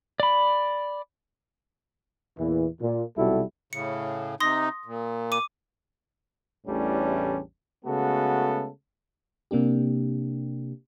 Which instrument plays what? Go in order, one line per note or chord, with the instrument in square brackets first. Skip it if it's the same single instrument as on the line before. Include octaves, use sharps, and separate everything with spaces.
[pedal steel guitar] D5 B5
[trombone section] E2 A#2 E3
A#2
B1 C3 G3 E4 F#4 A4
[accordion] A2 C#3 [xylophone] C#7
[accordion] C3 D#4 [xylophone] C6 D#6 A#6
[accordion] A#2
[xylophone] D6 D#7
[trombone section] A1 E2 A2 G3 C#4 D4
C#3 G#3 A3 B3 F#4 A4
[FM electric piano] C3 A#3 D4 G4